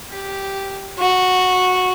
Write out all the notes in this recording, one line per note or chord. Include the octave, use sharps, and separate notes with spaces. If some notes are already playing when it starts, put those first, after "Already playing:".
G4
F#4